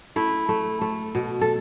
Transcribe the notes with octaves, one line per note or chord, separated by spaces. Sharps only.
A3 E4
A3
A3
B2
A4